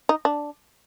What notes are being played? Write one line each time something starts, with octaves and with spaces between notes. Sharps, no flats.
D#4
D4